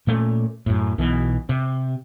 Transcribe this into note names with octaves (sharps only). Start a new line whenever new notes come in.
A#2 A3 A#3 C#4
F#2 A2
B1 B2 E3
C3